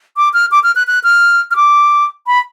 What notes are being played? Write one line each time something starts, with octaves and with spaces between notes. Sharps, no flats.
D6
F6
D6
F6
F#6
F#6
F6
F6
D6
B5